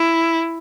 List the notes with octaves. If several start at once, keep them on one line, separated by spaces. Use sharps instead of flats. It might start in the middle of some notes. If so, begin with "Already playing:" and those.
Already playing: E4